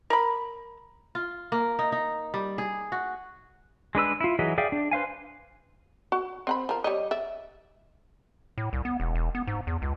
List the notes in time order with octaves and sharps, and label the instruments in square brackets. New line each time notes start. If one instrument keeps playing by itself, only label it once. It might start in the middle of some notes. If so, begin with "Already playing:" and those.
[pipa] A#4 B5
[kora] F4
A#3
D#4
D#4
G3
G#4
F#4
[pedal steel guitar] G#3 D4 B4 E6
E4 F4
E3 F#3 G#4 D#5 E5
G#4 D5 E5 F5 G5
D4
B4 C5 F5 G#5
[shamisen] F#4
C4 F#5 B5
F3 A#4
G3 C#5 D#5
D5 E5
[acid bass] A2
C2
B3
E1
E1
B3
G#2
E2
C#2